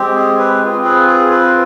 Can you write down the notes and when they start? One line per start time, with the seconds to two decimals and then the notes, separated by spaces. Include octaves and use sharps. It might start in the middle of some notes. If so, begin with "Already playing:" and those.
Already playing: G#3 C4 G4
0.16 G#4
0.39 B4
0.62 C4 F4 G#4
0.85 B4
1.08 G#4
1.31 B4